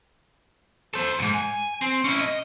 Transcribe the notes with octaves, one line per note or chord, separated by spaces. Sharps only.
A4 C5
D2 G#2
G#5
C4
C#4 E4
D#5